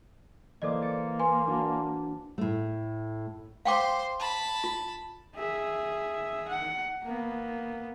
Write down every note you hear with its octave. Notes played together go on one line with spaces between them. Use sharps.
E3 A#3 A4 C5 D5 D#5 D6
A6 C#7 D7
B4 G#5 C6
D4 F#4
A2 A3
C5 F5 G5 C6 D6
A5 B5
F4
G#4 E5
F#5
A#3 B3